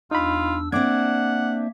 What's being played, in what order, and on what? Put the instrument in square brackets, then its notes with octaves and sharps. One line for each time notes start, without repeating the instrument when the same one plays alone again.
[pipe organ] E2 D4 E6 [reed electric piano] D#4 B5 [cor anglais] F4
[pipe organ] A#3 E5 [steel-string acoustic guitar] C4 D4 [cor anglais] F#5 [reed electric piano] D6 G#6